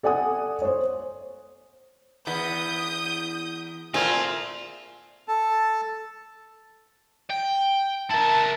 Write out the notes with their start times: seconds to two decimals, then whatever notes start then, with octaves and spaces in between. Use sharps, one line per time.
0.03 A4 D5 F#5 G#5 D#6
0.62 C5 C#5
2.27 E2 B3 D#6 G6
3.94 A#2 A3 C4 F4 G#4
5.28 A4 A5
7.30 G5
8.10 E4 A#4 A5